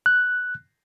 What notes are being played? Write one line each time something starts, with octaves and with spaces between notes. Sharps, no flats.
F#6